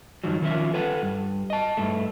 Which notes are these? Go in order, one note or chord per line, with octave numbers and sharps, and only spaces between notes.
G2 D#3 F3 F#3
D#3 F3 C#4 F4 E5
A4 B4 F#5
G2
D#5 A5
G2 A3